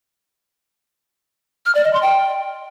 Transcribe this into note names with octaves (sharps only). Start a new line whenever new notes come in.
F6
D5
D#5
C6
G5